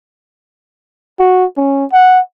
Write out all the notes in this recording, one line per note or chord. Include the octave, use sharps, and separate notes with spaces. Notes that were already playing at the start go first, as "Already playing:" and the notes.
F#4
C#4
F#5